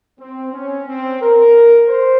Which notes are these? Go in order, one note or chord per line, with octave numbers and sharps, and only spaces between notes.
C4
C#4
C4
A#4
C5